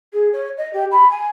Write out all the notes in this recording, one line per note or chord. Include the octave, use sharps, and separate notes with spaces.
G#4
C#5
D#5
G4
B5
G#5